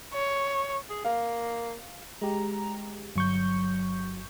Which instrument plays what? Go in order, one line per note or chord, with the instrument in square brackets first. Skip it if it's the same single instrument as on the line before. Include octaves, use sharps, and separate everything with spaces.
[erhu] C#5
[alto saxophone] G#4
[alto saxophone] A#3 [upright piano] F5
[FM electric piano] G#3 G4 [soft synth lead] A#5
[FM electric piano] G1 C#6 G6 [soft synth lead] F#3